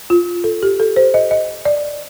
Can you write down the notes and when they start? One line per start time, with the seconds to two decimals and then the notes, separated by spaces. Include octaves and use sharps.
0.10 F4
0.44 A4
0.63 G4
0.80 A4
0.96 C5
1.14 D#5
1.31 D#5
1.65 D5